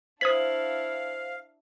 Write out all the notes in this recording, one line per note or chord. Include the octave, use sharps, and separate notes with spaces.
D4 E4 C5 F5 D#6 G#6 B6 F#7